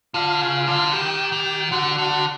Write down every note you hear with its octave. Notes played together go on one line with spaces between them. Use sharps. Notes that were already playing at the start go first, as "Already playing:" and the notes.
D3 F4 F5
C#3
D3
F#5
D#3 G4 G5
D#3
D3 F#4 F#5
F#4 F#5
D3
F5
F#4 F#5